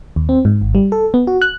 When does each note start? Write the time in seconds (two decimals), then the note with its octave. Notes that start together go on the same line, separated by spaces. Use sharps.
0.16 D#2
0.29 C4
0.45 G#2
0.62 G#1
0.75 G3
0.92 A4
1.14 B3
1.27 F#4
1.42 F#6